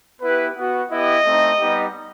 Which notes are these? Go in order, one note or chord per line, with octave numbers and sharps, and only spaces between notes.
B3 E4 G4 B4
B3 F#4
B3 E4 G4 D#5
A3 C4 D#4
G3 B3 D#4 G4